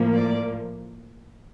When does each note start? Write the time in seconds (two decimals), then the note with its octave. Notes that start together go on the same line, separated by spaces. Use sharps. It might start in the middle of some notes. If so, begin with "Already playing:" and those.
Already playing: A2 F3 A#3
0.13 D5